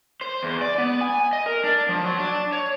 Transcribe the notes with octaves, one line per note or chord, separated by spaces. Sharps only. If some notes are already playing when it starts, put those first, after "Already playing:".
C5
E2
D5
B3
G#5
D#5
A#4
D4
F3
F#3
D4
C#5